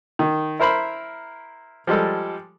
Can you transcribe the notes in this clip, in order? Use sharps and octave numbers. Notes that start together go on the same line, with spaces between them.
D#3
E4 A#4 C5 B5
F3 G3 G#3 A4